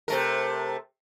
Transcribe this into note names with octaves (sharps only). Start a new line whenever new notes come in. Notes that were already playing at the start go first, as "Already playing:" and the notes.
C3 A3 A#4